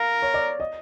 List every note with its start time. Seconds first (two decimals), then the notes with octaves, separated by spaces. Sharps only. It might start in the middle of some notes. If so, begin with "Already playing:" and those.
Already playing: A#4 F5
0.22 C#5
0.34 D5
0.60 D#5